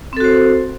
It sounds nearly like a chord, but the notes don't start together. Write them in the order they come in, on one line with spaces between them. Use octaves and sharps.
C4 A4 F#4 C5